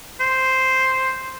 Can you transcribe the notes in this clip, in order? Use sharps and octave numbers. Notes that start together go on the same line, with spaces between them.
C5